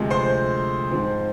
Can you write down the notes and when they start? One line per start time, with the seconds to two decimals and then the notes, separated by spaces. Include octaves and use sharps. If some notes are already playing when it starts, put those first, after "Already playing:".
Already playing: D2 C3 F3 G#3
0.10 C5 C6
0.91 G#2 F3 C4